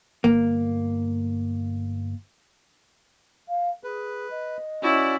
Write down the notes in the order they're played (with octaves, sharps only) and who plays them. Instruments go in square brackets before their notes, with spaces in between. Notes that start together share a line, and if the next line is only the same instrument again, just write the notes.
[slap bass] G1 [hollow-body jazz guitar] A#3
[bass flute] F5
[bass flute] G#4 [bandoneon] B4
[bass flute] D#5
[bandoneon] C#4 F#4 D5 [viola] E4